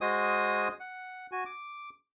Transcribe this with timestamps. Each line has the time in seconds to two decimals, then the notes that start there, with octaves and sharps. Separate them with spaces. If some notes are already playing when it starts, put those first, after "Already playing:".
0.01 G#3 F#4 C5 D#5 G#5 D#6
0.80 F#5
1.32 F#4 G#5
1.46 D6